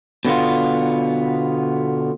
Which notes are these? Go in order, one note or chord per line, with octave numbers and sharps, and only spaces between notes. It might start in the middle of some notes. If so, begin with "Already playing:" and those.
B2 D3 B3 F4